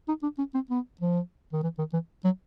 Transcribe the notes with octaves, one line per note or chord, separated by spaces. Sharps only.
D#4
D4
C#4
C4
B3
F3
D#3
E3
D#3
E3
F#3